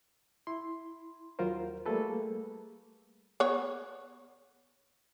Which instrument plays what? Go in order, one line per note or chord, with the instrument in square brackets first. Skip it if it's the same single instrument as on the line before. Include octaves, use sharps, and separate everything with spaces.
[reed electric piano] E4 C6
D#2 F#3 F4 A#4 C5
G3 A3 A#3 G#4 A4 B4
[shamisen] B3 C#5